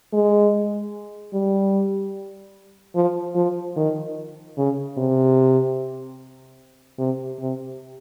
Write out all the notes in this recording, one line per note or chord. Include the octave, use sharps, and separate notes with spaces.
G#3
G3
F3
F3
D#3
C#3
C3
C3
C3